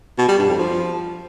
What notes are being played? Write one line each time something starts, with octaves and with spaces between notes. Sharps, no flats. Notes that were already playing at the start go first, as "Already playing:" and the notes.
B2
G3
G2
F2
F3